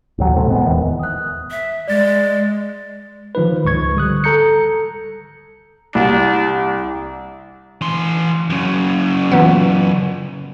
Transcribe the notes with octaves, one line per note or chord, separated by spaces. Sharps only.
A1 D2 F#3
A2 C3 A3
D#1 G#3 B3
E2 G#2 D#3 E3
D#6 F#6
E5
G#3 D5 A6
D#3 F3 D#4 B4
C#2 G#2 C#6 G#6
D3 G3 D#6 F#6
A4 A#5 G6 C#7
C2 D4
E3 C6
F#2 C#3
A#2 E3 B3